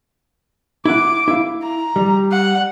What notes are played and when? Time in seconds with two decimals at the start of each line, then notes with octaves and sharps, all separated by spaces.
0.85 E4 F#5 D6
1.28 E4 F5
1.62 A#5
1.96 G3
2.31 F#5